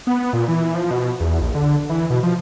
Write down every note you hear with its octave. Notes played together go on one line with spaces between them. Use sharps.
B3
B3
A#2
E3
F3
B2
E2
A#1
D3
E3
B2
F3